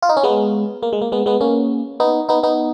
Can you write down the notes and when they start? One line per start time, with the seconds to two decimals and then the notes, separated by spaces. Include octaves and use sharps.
0.02 F4
0.09 D#4
0.17 C#4
0.23 G#3 B3
0.83 A#3
0.93 G#3
1.02 A#3
1.12 G#3 B3
1.26 G#3 B3
1.41 A#3 C#4
2.00 B3 D#4
2.29 B3 D#4
2.43 B3 D#4